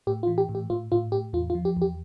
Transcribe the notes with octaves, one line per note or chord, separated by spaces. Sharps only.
A2 G4
F4
E3
G4
A2
G4
A2 F4
A2 F4
A2 G4
E2 F4
F4
F3
G4
E2 G4